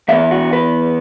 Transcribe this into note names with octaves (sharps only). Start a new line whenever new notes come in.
E2 E3 B3 E5
F#4
B4